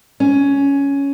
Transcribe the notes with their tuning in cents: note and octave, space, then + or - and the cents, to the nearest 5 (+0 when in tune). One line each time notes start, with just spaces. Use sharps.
C#4 +10